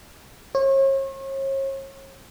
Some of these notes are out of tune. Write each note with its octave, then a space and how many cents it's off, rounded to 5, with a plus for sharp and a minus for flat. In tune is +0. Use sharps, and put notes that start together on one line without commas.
C#5 -40